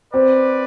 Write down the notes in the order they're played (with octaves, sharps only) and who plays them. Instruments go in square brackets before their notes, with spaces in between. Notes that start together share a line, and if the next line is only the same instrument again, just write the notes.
[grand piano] C4 [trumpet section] B4 D5